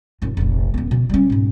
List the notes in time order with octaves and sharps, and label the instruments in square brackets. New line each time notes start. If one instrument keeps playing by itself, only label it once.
[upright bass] D#1 F#2
F1 A#1
D#1 B3
B2
G3 C#4
G#2 B2